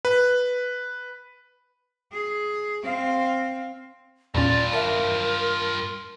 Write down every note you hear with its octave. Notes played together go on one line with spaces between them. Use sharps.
B4
G#4
C4 F5
E2 G2 A#2 C#4 F4 D5
A#4 E5 A5